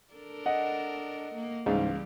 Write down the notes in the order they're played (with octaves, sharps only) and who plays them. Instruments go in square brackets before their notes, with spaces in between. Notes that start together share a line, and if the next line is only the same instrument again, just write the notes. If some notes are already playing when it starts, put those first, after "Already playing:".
[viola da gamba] D4 A4 A#4
[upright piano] D#5 F#5
[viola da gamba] A#3
[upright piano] C#2 F5 [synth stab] G#2 [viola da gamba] E3 G3